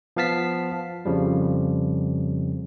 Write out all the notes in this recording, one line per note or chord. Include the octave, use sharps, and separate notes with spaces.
F3 B3 F5 A5 B6 C7
F2 C#3 F3 G3